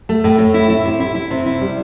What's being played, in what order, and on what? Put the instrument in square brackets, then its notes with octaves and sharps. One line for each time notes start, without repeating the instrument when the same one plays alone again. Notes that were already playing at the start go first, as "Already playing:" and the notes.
[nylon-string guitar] A3
A2
A2
E4
E4
C3
E4
E4
C3
E4
G3